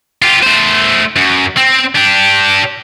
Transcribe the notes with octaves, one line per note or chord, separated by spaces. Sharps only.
F4 G4
A3 C5
F#2
C4
D4 G4